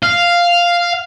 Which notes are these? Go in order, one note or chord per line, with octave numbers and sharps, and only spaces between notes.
F5